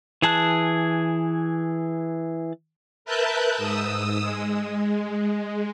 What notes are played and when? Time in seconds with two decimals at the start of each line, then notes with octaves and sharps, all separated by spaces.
0.22 E3 G#4 A5 F#6
3.05 A#4 B4 E5 A5 F#6 G6
3.57 G#2 D#6 E6
4.22 G#3